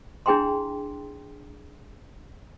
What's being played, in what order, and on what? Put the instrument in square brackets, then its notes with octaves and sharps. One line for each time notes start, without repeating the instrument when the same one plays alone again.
[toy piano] D4 E4 G#4 G5 A#5 C6